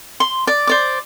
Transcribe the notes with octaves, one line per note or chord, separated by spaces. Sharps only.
C6
D5
C5 D5 D6